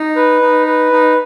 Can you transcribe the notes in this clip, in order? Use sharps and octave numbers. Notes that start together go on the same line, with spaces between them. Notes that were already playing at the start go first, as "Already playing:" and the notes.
Already playing: D#4
B4
D#4
B4
D#4